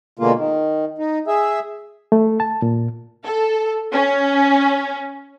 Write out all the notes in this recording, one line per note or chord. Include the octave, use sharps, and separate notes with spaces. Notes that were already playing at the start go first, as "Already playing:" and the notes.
B2 D3 G#3 A#3 F4
D#3
D#4
G#4 E5
A3
A5
A#2
A4
C#4